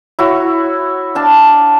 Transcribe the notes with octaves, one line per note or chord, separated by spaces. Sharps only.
E4 F#4 C#5
D4 F5 A5